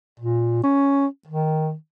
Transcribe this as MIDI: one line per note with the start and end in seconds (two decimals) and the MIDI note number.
0.19 0.61 46
0.63 1.06 61
1.27 1.74 51